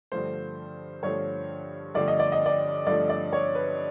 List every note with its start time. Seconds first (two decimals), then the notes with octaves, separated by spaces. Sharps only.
0.12 G2 D3 F3 A3 C5
1.03 G2 D3 F3 A3 C#5
1.94 G2 D3 F3 A3 D5
2.08 D#5
2.19 D5
2.32 D#5
2.46 D5
2.86 G2 D3 F3 A3 D5
3.10 D5
3.33 C#5
3.55 B4